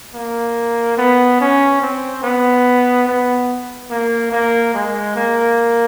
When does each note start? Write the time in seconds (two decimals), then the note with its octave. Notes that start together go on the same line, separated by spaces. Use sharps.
0.15 A#3
0.98 B3
1.41 C#4
1.82 C4
2.23 B3
3.08 B3
3.91 A#3
4.32 A#3
4.74 G#3
5.16 A#3